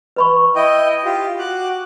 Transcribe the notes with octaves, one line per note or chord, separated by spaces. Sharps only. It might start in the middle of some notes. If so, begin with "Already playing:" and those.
B4 B5 C#6
E4 D#5 G5
F4 G4
F#4 D6 F#6